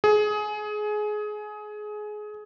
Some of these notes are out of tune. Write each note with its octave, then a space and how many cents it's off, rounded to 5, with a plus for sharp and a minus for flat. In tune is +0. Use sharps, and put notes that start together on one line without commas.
G#4 +20